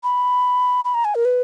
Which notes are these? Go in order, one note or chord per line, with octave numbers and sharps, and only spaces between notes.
B5
B5
A#5
G#5
A#4
B4